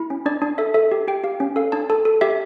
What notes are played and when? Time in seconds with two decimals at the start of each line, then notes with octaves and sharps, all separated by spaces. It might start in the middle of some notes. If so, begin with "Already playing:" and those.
Already playing: E4
0.10 C#4
0.26 D4 D5
0.42 D4
0.58 A4 E5
0.74 A4 E5
0.92 G4
1.08 G4 G5
1.24 G4 F5
1.40 C#4
1.56 A4 F5
1.72 D4 A5
1.90 A4 A5
2.05 A4
2.21 G4 E5